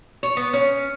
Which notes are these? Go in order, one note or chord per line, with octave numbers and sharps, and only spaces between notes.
C#5
B3
C#4